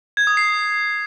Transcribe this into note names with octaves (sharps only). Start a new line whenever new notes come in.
G#6
D#6
C7